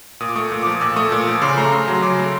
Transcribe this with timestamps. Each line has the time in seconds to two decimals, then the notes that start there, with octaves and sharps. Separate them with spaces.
0.20 A#2 D#6
0.28 D6
0.36 A3 C#6 D#6
0.52 A#2
0.62 F3 D6
0.72 D#6
0.81 A#2 D6 E6
0.96 A3 C#6 D#6
1.12 A#2
1.27 F3
1.42 C#3 C6 D6
1.57 A3 A#5 C6
1.72 C#3
1.88 F#3
2.03 C#3 C6 D6
2.19 A3